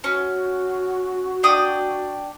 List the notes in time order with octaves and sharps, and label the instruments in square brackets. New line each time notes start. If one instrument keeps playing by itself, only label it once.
[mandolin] C#4 [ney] F#4
[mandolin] D4 G5 D#6